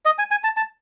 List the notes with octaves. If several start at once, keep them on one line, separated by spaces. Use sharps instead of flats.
D#5
G#5
G#5
A5
A5